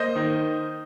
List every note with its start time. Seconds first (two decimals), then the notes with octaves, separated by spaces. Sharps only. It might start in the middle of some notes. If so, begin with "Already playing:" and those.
Already playing: A#3 C5 D#5
0.16 D#3